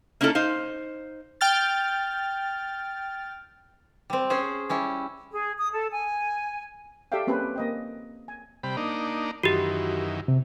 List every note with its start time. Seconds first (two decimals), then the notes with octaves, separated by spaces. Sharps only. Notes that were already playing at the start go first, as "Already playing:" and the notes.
0.21 A#3 C#4 D#4 E4 A4
0.35 D#4 C5 F5
1.41 G5 F6 A6
4.10 G3 C4
4.30 C#4 G#4 C5
4.69 G3 C#4 E4
5.32 G#4
5.58 D#6
5.72 A4
5.93 G#5
7.12 G4 A4 D5 E5 F5 G5
7.27 A#3 C4 C#4 G4 B4 C5
7.56 A#3 D#5 G5
8.28 G#5
8.63 C3 G3 B5
8.77 A#3 D4 D#4
9.43 F#2 D#3 E3 F#4 G4
10.28 C3